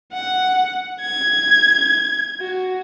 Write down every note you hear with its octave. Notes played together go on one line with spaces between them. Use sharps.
F#5
G#6
F#4